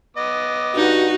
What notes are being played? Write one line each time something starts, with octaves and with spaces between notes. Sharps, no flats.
B3 D#5 D6
G2 D#4 F#4